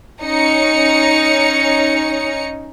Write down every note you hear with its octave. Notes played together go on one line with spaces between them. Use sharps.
C#4 D#4 C#7